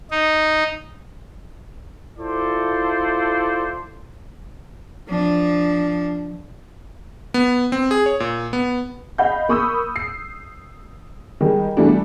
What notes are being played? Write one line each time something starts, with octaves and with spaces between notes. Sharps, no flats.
D#4
E4 F4 A4 C5 D5
F3 D4
B3
C4
G#4
C#5
A#2
B3
D#5 F5 B5 G6
A#3 B5 C#6 D#6 E6 G6
C7
D#3 G3 G#3
B2 E3 G3 A3 D4 F#4